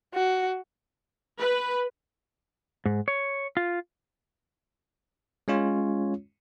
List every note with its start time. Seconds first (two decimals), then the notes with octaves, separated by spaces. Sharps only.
0.15 F#4
1.38 B4
2.86 G#2
3.08 C#5
3.57 F4
5.48 G#3 C#4 F4 C#5